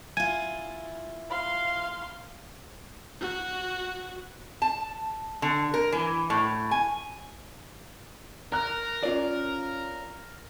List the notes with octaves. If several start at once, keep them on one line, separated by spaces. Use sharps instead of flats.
E4 F4 G#5
F5 C6
F#4
A5
D3
A#4
E3
A2
G#5
A#4 A#5 F#6
C#4 F4 D5